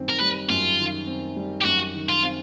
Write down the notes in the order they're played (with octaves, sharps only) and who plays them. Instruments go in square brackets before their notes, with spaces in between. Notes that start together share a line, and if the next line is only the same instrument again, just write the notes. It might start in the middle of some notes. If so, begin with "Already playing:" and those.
Already playing: [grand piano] F#2 D#3 G3 C4
[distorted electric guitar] A#4
[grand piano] G3 [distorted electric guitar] B4
[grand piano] F#2 [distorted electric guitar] F4
[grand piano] D#3
C4
G3
[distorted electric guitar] G4
[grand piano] F#2 [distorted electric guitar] F#4
[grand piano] D#3
[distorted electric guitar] F4
[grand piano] C4